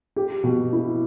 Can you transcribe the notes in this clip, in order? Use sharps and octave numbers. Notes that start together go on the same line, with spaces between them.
G4
B2
E4